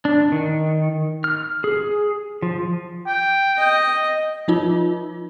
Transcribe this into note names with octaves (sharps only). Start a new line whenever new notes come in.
D4
D#3
F6
G#4
F3
G5
D#5
F3 D#4 F4